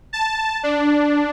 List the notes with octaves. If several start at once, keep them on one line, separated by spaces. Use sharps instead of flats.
A5
D4